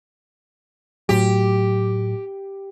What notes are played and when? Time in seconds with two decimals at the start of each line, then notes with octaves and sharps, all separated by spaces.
1.09 A2 F#3 G4